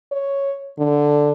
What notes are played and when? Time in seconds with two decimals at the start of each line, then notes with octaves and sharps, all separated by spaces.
0.12 C#5
0.79 D3